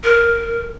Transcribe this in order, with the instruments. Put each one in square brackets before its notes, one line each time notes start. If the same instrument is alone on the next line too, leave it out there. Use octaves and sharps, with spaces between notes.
[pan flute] A#4